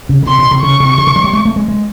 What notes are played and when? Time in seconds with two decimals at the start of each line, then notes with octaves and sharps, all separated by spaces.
0.09 C#3
0.23 C#3
0.26 C3 C6
0.38 B2
0.51 C3
0.62 C#3 C#6
0.80 C3
0.98 C#3
1.07 D3
1.16 F#3
1.24 G3
1.33 G#3
1.45 A3
1.56 G#3
1.68 G#3